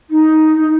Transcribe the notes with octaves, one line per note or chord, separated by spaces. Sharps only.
D#4